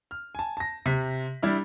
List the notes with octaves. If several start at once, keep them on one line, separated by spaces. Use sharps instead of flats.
F6
G#5 A5
A5 A#6
C3 B6
G3 D4 E4 F6